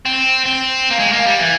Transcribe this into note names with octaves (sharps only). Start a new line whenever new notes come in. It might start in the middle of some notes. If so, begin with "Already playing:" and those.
C4
C4
A#3
G#3
A#3
G3
E3